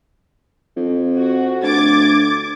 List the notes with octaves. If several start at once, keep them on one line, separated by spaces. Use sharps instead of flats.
F2
F#4
D2 D6 G#6 A6